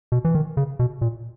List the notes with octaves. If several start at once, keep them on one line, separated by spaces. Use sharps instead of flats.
B2
E3
D#3
C#3
B2
A#2